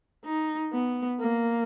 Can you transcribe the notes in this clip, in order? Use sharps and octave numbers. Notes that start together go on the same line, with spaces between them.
D#4
B3
A#3